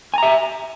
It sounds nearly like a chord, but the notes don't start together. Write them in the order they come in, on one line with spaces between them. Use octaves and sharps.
G#5 A#5 E5